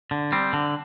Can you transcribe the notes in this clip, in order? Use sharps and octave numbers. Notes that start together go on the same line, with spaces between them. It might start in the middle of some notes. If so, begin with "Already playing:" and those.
D3
G3 C4
D3